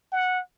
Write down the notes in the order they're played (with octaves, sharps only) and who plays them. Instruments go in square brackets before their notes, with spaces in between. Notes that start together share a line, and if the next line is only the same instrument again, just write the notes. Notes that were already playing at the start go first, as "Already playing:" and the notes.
[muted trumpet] F#5